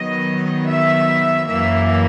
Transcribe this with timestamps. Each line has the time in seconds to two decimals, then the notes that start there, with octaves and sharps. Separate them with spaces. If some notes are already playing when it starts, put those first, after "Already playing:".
Already playing: D#3 F#3 B3 D#5
0.69 E5
1.49 F#2 E3 A#3 E5